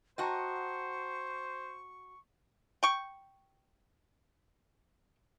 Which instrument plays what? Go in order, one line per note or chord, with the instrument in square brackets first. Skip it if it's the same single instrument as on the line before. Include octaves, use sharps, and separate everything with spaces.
[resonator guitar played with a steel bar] F#4 D#5 [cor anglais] C5 [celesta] G5 A5 A#5 [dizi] C#6
[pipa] G5 C#6